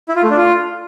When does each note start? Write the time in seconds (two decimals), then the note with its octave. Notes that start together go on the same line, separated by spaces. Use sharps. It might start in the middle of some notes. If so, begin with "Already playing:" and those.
0.09 E4
0.16 F4
0.23 A3
0.30 D4
0.38 F4